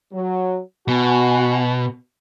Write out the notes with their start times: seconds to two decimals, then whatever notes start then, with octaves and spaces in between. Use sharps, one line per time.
0.13 F#3
0.88 B2 F#4 G#5